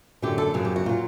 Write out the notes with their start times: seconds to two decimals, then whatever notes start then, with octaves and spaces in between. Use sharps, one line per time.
0.22 F#2 D3 F#3 G4
0.38 A4
0.54 F#2 C#3 F#3 G#4
0.65 G4
0.76 F#4
0.86 A#2 F#3 F4